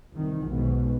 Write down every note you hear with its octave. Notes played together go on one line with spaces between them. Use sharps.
C2 D#3
B1 G#2 B2